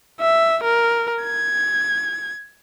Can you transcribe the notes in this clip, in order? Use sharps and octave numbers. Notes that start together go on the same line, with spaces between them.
E5
A#4
G#6